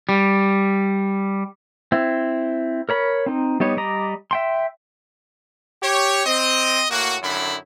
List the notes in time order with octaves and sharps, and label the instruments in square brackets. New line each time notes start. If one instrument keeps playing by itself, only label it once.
[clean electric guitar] G3
[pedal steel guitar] C4 E4
A#4 C#5 B5
C4 D#4
G3 B3 D#4 C#5
G3 D5 D#5 A#5
E5 G5 C6
[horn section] G4 C#5
C4 D#5
A2 A#3 F#4
F#2 D3 D#3 E4 B5